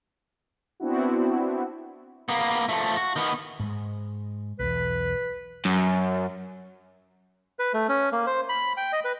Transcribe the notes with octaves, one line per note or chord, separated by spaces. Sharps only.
B3 C4 D4 E4 F#4
A#3 B3
F3 A3
F#4
D#3 B3
G#2 G#3
B1 E2 B4
F#2
B4
A3
C#4
A#3
C5
B5
G5
D#5
B4